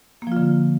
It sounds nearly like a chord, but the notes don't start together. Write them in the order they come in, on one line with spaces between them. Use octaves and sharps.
A#3 F3 F4 D3